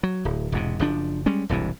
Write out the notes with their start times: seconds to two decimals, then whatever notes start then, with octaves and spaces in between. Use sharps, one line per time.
0.03 F#3
0.25 D1
0.52 E1 G#2 C3
0.79 F#1 F3 D4
1.26 G3 G#3 C#4
1.49 E1 C2 G2 E3